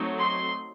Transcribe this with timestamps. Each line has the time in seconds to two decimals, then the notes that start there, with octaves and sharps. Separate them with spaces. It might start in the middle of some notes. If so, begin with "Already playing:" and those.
Already playing: F#3 A3 C4 D#4
0.19 C6